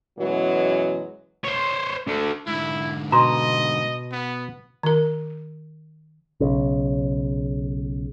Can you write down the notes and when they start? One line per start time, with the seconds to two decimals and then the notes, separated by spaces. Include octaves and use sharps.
0.18 F#2 B2 E3 F#3 G#3
1.44 C5 C#5
2.08 A3 D4
2.47 G#2 D3 E4
3.12 B2 D#5 A#5 C6
4.12 B3
4.83 D#3 A#4
6.40 B1 C#3